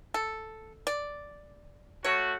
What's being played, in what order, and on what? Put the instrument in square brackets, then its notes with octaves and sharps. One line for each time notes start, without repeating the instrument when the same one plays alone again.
[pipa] A4
D5
[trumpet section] A3 F#4 [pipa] C#5